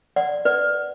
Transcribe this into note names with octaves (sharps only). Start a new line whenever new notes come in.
D5 F#5
B4 D5